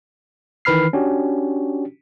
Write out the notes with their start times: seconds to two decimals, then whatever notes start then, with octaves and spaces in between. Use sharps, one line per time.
0.65 D#3 E3 B4 B5 F6 C7
0.93 C#4 D4 F#4 G4